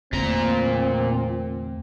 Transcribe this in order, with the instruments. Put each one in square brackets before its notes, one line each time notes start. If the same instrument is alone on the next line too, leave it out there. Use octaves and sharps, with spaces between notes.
[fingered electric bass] E2 D3 A3 [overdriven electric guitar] A#2 A#5 [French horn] C4